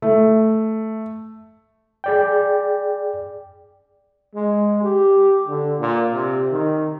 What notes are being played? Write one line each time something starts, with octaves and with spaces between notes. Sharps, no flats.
A3
G#4 D5 G5
G#3
G4
D3
A#2
C3
D#3